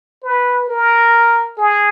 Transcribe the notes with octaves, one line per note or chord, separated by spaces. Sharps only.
B4
A#4
G#4